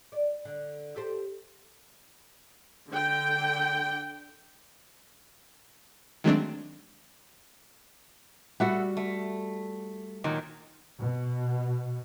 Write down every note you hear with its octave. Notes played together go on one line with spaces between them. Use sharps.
D5
D3
G4 A4 C5
D3 G5
D#3 F#3 G#3 A3 C4 D4
G3 F#4 A4 E5 F#5
A3
A#2 D#3 F#3
B2